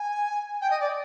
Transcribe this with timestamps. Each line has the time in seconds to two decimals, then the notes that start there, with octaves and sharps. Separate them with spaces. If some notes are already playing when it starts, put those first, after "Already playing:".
Already playing: G#5
0.61 G5
0.70 D#5
0.80 D5